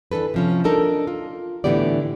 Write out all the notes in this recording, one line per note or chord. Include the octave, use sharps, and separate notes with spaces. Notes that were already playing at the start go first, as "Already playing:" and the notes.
E3 D4 A4 B4
C3 F3 C#4
D4 D#4 A4 A#4
F4
A2 D3 E3 B3 G4 D5